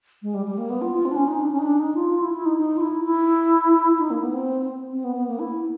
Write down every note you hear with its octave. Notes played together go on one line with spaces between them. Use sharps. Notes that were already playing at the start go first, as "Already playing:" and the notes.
G#3
G3
G3
A#3
B3
F4
F4
C4
D4
C#4
D#4
D4
C#4
D#4
D4
D#4
F4
F4
E4
E4
D#4
D#4
F4
E4
E4
D#4
A#3
B3
C4
C4
B3
B3
A#3
E4